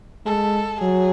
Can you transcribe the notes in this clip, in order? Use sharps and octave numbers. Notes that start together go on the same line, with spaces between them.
G#3 A4
F#3 G#4